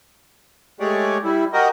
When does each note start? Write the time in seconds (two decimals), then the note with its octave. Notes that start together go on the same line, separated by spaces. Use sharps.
0.80 G#3 A3 G4 G#4 C#5 D5
1.24 G3 E4
1.53 F#4 G4 A#4 D#5